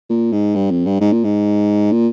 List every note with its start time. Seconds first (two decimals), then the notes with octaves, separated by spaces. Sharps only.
0.10 A#2
0.32 G#2
0.55 G2
0.71 F2
0.86 G2
1.01 G#2
1.13 A#2
1.24 G#2
1.92 A#2